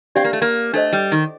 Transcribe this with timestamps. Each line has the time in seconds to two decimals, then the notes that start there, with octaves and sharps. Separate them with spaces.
0.15 C4 D4 G4 D5 F5
0.24 A#3
0.33 A3
0.42 A#3
0.73 A3 D4 A4 C5 D#5
0.93 G3
1.12 D#3